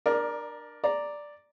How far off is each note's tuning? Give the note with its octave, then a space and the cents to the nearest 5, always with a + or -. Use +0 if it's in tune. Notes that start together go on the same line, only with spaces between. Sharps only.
D4 +30 A#4 +15 D5 +0
D5 +0 A#5 +0